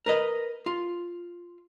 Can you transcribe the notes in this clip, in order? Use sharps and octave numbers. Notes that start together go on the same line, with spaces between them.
A#4 B4 D#5
F4